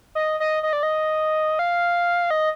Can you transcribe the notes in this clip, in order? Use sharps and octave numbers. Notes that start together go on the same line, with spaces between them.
D#5
D#5
D#5
D5
D#5
F5
D#5